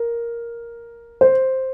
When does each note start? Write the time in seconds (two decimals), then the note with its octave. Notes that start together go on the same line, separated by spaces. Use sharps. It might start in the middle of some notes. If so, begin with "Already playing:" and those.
Already playing: A#4
1.21 C5